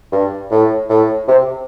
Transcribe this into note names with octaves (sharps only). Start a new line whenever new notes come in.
G2
A2
A2
C3